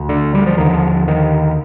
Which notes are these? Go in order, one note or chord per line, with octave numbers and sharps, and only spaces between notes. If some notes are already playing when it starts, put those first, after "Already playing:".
Already playing: D2
D3
G3
F3
D#2 D3 D#3
F3
D#3